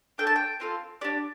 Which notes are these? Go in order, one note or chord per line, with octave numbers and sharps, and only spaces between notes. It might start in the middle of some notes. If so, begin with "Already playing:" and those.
D4 A4 G5
A5
G5
C4 F4 A4
D4 G4 D5